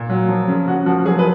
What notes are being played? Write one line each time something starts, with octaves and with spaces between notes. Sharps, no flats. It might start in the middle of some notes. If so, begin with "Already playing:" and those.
Already playing: A#2
F#3
F3
C#3
C#3 F#4
F3 F#4
F#3 G#4
B4